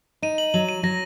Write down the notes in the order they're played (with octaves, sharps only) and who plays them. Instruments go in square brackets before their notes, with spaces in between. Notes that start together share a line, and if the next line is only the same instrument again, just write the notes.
[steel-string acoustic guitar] D#4 [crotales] D#7
[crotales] F#7
[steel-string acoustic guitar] F#3 [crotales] F#7
[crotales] D#7
[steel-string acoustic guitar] F#3 [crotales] A#6